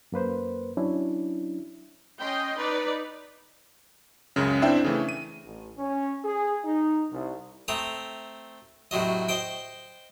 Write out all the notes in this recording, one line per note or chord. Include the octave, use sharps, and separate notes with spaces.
F#2 A#3 B4 C5
F#3 C#4 D4 E4
C#4 D#5 G5 C6
D#4 B4 D5
C#2 F#2 C#3
C4 D4 E4 C5 E5 G5
C#3 E3 A3
D#7
A1
C#4
G#4
D#4
C2
A3 C4 A#5 D#6
A2 C3 F#3 D#5
C5 D#5 G5